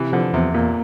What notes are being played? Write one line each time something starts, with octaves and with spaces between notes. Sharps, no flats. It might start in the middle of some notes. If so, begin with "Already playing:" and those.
Already playing: C3 E3
D3 F3
E2 C3
A#2 A#3